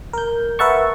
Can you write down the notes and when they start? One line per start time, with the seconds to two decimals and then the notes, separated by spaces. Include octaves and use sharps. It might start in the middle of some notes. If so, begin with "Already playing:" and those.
0.13 A#4 G6
0.59 A#4 B4 E5 F#5 A5 C#6